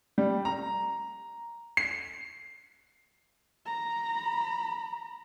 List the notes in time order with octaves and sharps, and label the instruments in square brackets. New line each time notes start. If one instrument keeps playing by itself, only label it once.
[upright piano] G3
A#5
C7
[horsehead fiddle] A#5 B5